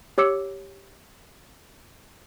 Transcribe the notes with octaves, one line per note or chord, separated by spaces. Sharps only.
G4 C#5 D6 E6 C#7